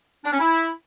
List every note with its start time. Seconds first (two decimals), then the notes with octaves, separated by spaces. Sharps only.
0.25 D4
0.32 C#4
0.39 E4